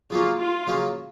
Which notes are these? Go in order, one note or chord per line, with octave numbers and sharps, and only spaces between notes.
C#3 F#3 A#3 C#4 F4
F4
C#3 F#3 A#3 C#4